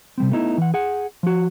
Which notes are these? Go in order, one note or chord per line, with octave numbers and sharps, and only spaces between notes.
C3 G3 C4
A3 B3 D#4 E4
E3 F#5
G#4 F#5
F3 F#4